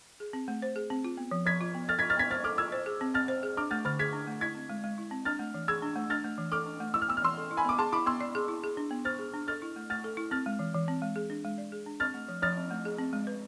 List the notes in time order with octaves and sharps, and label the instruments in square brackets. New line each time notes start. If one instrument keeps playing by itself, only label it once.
[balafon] G#4
C4
A3
C5
G#4
C4
F4
B3
F3
[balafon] F3 [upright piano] G#6 B6
[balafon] F4
B3
[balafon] A4 [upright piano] F6 A6
[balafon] F4 [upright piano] G#6 B6
[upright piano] F6 A6
[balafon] B3 [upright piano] G#6 B6
[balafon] C5 [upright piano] F6 A6
[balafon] A4 [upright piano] D6 F6
[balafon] F4 [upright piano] E6 G#6
[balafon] C5
G#4
C4
[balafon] C4 [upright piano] F6 A6
[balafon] C5
G#4
[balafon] D4 [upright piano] D6 F6
[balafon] A3 [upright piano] F6 A6
[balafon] D3 [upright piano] F6 A6
[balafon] G#4 [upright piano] G#6 B6
[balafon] D4
A3
[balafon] E4 [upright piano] G#6 B6
[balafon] C4
G#3
G#3
E4
C4
[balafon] D4 [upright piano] F6 A6
[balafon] A3
E3
[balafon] G#4 [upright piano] E6 G#6
[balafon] D4
A3
[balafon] D4 [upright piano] F6 A6
[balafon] A3
E3
[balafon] A4 [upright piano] D6 F6
[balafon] D4
A3
[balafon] E4 [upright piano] E6
[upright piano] F6
[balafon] B3 [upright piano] E6
[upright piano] F6
[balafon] E3 [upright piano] C6 E6
[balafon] A4
E4
[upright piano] G#5 B5
[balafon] B3 [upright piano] D6
[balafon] G#4 [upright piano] A5 C6
[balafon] E4 [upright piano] B5 D6
[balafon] B3 [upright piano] C6 E6
[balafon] D5
G#4
E4
G#4
D4
B3
[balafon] C5 [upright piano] F6 A6
[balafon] G#4
D4
[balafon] A4 [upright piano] F6 A6
[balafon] E4
A3
[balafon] A3 [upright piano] F6 A6
[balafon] A4
E4
[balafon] C4 [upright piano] F6 A6
[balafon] G#3
E3
E3
C4
G#3
G#4
D4
G#3
D5
G#4
D4
[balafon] C4 [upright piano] F6 A6
[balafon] A3
F3
[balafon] F3 [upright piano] F6 A6
[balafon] C4
A3
G#4
C4
G#3
B4